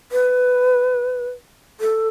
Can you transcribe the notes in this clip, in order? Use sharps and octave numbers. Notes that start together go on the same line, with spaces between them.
B4
A4